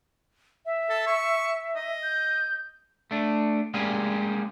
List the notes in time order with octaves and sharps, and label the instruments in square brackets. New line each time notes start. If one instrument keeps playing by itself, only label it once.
[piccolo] E5
[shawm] A4
C#6
D#5
[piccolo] G6
[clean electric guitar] A3 D4
G3 G#3 A#3 C#4 G4 G#4